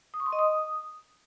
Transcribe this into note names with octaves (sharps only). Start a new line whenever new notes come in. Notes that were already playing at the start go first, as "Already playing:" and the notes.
D#6
C#6
C6
D#5
D#6